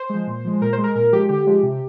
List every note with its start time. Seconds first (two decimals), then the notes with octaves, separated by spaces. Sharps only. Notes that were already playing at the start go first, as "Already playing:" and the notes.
Already playing: C5
0.09 F3 G#3
0.27 A#2
0.45 F3 G#3
0.61 A#2 A#4
0.73 C5
0.78 G#3
0.84 A#4
0.95 A#2 A#4
1.13 F3 G#3 G4
1.29 D3 G4
1.47 F3 G#3
1.63 C3